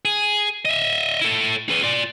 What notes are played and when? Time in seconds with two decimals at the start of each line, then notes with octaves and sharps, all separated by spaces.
0.05 G#4
0.65 D#5 E5
1.21 E4 A4
1.69 G#4 B4
1.83 F4 D5